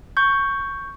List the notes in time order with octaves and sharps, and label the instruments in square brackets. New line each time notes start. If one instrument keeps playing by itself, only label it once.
[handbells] C#6 G6